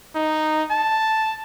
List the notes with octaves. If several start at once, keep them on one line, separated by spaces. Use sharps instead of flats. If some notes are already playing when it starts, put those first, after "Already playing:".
D#4
A5